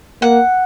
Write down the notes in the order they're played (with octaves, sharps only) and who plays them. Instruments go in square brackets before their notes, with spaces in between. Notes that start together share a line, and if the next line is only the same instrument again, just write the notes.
[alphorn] A#3 [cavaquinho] F#5